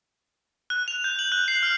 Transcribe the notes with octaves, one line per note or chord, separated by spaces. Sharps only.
F#6
F7
G6
F#7
F#6
C7
F6